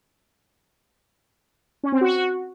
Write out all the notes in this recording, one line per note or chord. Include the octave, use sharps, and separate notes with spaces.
C#4
C4
F#4